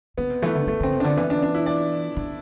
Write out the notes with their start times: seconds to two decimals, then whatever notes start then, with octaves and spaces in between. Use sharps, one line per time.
0.18 D3 B3
0.30 C3
0.42 E3 A3
0.55 D3
0.67 D3 A3
0.80 D3 C4
0.92 C3
1.00 D3 D4
1.17 E3 B3
1.30 D4
1.42 D4
1.55 E4
1.66 D5
2.16 D3